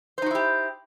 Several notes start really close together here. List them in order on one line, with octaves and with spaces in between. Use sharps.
C5 D#4 F#4 E4 G4